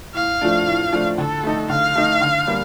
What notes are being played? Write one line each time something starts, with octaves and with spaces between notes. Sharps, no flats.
A2 F5
F3 A3 D4
A2
F3 A3 D4
D3 A4
A3 D#4
D3 F5
A3 D#4
D3
G3 A#3 D4